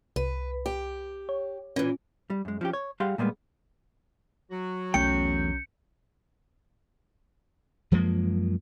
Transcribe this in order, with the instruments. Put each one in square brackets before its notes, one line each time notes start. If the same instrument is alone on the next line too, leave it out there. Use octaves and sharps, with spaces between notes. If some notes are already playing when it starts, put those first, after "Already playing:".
[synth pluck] C2 [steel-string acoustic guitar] B4
[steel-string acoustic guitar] G4
[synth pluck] C#5
[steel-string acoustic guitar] A#2 E3 [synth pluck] C#4
[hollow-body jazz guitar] G3
F#2 G#3
F3 C#4 G4
C#5
G3 G4 G#4 F5 F#5 C6
A#2 G3 G#3 A#3 B3
[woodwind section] F#3 F#4
[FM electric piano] B1 C#4 G6 [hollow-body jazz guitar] E2 A3 G5 [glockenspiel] C#7
[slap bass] F#2 F3 G#3 A#3